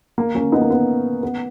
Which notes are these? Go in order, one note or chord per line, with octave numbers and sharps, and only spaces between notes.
A#3
A#3 C#4
B3 D#4
A#3
B3
B3